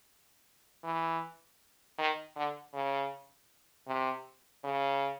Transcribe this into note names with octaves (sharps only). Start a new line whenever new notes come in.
E3
D#3
D3
C#3
C3
C#3